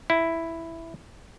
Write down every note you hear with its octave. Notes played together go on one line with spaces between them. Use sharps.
E4